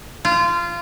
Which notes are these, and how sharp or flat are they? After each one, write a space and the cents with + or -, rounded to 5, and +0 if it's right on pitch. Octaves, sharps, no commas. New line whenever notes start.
F4 -20